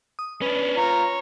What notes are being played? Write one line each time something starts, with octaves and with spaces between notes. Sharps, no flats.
D#6
C#4 D4 B4
F4 C#5 A#5